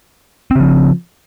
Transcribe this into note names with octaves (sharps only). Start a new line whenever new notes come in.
C#3 F3 C4